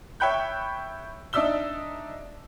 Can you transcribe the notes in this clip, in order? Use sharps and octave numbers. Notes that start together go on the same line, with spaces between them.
C#5 E5 G5 B5 F#6 G6
D4 D#4 D5 E5 E6 G7